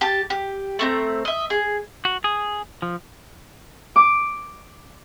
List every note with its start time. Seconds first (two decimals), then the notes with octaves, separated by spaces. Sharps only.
0.01 G4 A5
0.30 G4
0.79 A3 C4 A#5
1.25 D#5 E5
1.50 G#4
2.05 F#4
2.24 G#4
2.82 F3
3.96 D6